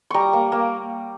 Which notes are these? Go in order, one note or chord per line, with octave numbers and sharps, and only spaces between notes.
G3 A#5 C#6
A#3
A#3